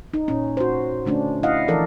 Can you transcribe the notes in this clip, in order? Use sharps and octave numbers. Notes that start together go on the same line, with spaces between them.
D#4
A#2 C#4
F#4 C5
D3 A3 C#4 D4
E4 D#5 F5 F#5
E3 F3 A4 A#4 D5